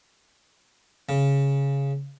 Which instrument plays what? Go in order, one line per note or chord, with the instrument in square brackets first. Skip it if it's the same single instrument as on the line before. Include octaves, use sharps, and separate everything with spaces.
[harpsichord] C#3